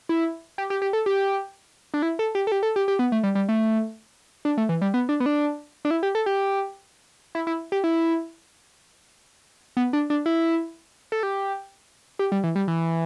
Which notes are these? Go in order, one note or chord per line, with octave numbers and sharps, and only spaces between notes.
E4
G4
G4
G4
A4
G4
D4
E4
A4
G4
A4
G4
A4
G4
G4
B3
A3
G3
G3
A3
D4
A3
E3
G3
B3
D4
B3
D4
D4
E4
G4
A4
G4
E4
E4
G4
E4
B3
D4
D4
E4
A4
G4
G4
G3
E3
G3
E3